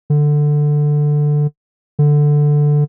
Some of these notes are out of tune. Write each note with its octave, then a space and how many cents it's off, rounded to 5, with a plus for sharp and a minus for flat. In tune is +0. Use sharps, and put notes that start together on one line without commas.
D3 +10
D3 +5